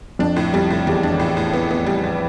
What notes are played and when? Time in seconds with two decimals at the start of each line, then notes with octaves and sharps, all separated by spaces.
0.19 F2 D4
0.36 A2
0.54 F2 G3
0.70 A2
0.87 E2 G3
1.03 D4
1.12 E2
1.20 A2
1.37 A2
1.53 B3
1.71 B3
1.86 G3
2.04 A2